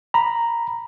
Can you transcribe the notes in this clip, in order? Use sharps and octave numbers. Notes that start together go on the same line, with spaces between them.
A#5 B5